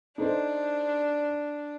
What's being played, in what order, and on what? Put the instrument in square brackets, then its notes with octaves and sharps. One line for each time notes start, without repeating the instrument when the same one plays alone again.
[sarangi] D4 [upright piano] D#4 A4 C5